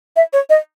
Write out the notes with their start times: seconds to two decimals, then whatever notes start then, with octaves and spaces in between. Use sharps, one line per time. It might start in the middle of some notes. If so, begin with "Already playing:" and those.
0.16 E5
0.33 C#5
0.50 D#5